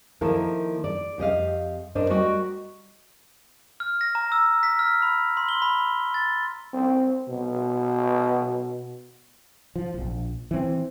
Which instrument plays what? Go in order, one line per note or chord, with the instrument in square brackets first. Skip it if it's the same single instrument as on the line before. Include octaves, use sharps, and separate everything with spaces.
[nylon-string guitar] D#3 F3 A#3 E4 A4 A#4
D5
F2 G4 D#5 F5
D4 A#4 C5 D#5
G3 F#4 A#4 D#5 G5
[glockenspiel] F6
A#6
A#5
E6
B6
F6
B5
C6
G7
B5
A6
[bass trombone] C4
B2
[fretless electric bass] F3
D#1 A#1
E3 C4